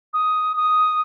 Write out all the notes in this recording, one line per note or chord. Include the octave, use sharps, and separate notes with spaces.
D#6
D#6